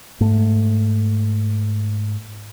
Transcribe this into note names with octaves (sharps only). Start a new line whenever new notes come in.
G#2 A3